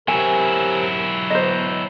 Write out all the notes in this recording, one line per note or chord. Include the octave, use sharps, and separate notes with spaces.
C3 F#3 E4 A#4 G#5
B2 C5 D#5 A#5